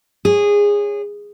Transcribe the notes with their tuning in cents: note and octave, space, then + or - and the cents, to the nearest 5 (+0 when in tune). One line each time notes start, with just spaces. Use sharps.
G#4 -20 C#5 +0